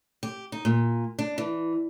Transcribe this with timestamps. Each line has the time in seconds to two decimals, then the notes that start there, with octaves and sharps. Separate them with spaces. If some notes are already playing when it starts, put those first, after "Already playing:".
0.23 G4
0.52 D#4
0.65 A#2
1.19 D4
1.38 E3